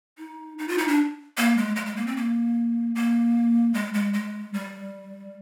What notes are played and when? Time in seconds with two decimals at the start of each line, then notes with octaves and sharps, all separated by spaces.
0.18 D#4
0.58 D#4
0.68 F4
0.78 D#4
0.88 D4
1.37 A#3
1.57 G#3
1.76 G#3
1.86 G#3
1.96 A#3
2.06 C4
2.16 A#3
2.95 A#3
3.74 G#3
3.94 G#3
4.13 G#3
4.53 G3